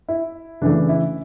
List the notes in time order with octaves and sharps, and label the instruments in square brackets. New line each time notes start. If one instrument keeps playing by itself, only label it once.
[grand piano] E4
C#3 E3 A3 D4
E4